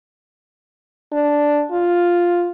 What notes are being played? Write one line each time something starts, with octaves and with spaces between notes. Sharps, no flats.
D4
F4